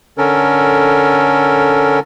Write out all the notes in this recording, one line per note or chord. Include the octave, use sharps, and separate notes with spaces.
D3 C#4 A4 A#4